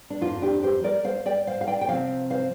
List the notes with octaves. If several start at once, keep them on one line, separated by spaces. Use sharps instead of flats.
D4
F2 F3 A#3 F4
D4 G4
G4 C5
A#4 D5
C5 F5
D5 G5
C5 F5
F5
D5 G5
G5
C3 F3 C4 C5 F5
C5 F5